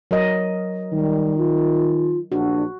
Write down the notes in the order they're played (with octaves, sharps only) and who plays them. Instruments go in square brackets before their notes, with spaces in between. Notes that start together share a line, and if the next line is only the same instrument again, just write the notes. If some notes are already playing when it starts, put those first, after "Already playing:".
[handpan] F#3 A#4 D#5
[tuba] D#3 [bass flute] G3
[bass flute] F4
[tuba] A#1 [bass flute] D4 [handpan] F#4